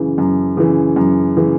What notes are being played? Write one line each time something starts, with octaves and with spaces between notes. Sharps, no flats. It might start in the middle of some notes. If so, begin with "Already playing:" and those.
Already playing: F#2 C#3 E3
F#2
C#3 E3
F#2
C#3 E3